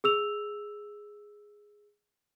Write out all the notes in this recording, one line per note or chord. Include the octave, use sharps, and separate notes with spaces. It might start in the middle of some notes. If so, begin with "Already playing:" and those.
G#4 E6 F7